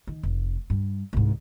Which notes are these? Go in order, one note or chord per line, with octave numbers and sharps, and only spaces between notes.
D#3
F1
G2
C2 G#2